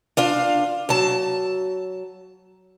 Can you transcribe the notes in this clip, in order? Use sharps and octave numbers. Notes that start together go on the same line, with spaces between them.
D4 F4 F5
F#3 A5